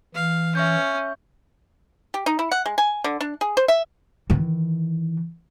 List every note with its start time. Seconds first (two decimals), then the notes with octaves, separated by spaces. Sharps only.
0.15 E3 F5
0.55 C#4 E5 C#6 G6
2.14 G4
2.26 D#4
2.39 E4
2.52 F#5
2.66 G#3
2.78 G#5
3.04 D3
3.21 D4
3.41 G#4
3.57 C5
3.68 E5
4.30 D#3 E3